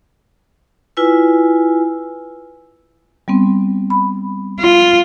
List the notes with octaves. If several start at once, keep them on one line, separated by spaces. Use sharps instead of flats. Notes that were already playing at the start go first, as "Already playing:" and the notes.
E4 F4 B4 G#5 E6
G3 B3 C4
B5
F4